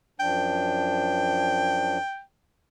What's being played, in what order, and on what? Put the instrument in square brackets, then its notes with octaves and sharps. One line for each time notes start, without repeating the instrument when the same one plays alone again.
[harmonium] F#2 F3 D4 [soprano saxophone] G5